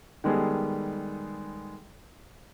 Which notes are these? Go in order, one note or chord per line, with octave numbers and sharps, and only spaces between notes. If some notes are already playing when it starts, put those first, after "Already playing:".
D#3 G3 G#3 B3 G#4 A4